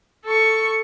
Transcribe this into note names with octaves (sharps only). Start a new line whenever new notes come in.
A4 C#6